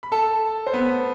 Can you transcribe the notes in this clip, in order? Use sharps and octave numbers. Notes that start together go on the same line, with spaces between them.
B5
A4 A5
C5
B3 B4